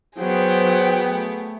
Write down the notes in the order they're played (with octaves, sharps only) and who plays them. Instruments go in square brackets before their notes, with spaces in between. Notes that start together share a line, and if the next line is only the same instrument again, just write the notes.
[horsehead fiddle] F#3 G5 [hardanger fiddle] B3 G#4 [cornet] C5
[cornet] A3